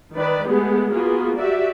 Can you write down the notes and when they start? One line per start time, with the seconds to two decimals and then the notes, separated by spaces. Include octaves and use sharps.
0.15 D#3 B4 D5
0.46 G#3 A3 B3 G4 G#4
0.92 A#3 B3 F4 F#4 G#4
1.38 F#4 G4 D5 E5